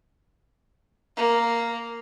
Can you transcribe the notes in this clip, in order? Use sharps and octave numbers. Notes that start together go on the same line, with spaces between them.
A#3